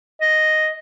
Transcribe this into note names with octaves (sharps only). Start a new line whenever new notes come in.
D#5